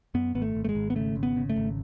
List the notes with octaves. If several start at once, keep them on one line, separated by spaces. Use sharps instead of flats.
F#2 B3
G#1 B3
A3
G#1
A3
G#3
G#1
B3
C#3 A3
G#1
B3
C#3
A3
G#1